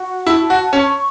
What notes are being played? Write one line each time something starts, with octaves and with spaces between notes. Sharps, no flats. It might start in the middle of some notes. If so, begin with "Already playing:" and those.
Already playing: F#4
E4 A5
F#4
C#4 C#6